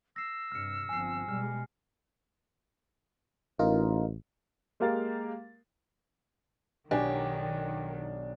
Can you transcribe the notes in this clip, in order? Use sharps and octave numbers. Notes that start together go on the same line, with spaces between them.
E6 A#6 C7
G2 C3 F6 C#7
G1 F3 C4 G#5 C7
B2 G3 G#3 F6
A1 D#4 F4 A#4
G#3 A#3 G4 A#4 F5 A6
B1 D#3 D4 G4 G#5